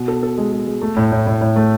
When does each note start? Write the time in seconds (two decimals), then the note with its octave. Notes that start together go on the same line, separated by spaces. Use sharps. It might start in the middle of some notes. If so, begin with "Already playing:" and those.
Already playing: B2
0.08 A4
0.23 A4
0.38 G#3
0.52 G#3
0.67 G#3
0.82 A3
0.96 A2
1.12 A2
1.27 A2
1.41 A2
1.56 A3